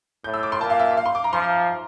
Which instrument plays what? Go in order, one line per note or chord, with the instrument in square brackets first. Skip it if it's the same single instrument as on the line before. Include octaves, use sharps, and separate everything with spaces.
[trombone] A2 [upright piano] G6
[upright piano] E6
D6
C6
[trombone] A#2 [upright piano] A5
[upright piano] F5
E5
F5
C6
D6
A#5
[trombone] F3 [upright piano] C6